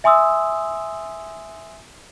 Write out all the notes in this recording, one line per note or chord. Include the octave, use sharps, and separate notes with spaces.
E5 G#5 C6 D#6 E6